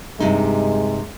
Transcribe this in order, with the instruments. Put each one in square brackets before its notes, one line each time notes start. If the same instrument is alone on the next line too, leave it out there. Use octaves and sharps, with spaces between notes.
[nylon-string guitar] G2 C3 D#4 [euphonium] G#3